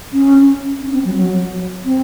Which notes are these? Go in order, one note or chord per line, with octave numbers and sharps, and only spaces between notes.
C#4
C#4
C4
F#3
F#3
C4